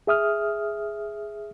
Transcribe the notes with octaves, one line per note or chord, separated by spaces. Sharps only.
G#4 E5 D#6 F6